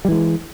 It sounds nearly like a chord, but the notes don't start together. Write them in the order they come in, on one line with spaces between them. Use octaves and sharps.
G3 E3 G#3